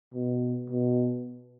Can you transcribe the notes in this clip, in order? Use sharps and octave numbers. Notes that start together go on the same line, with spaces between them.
B2
B2